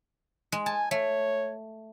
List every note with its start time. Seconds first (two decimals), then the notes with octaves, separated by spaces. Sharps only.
0.52 G#3
0.66 G#5 A5
0.91 A3 C#5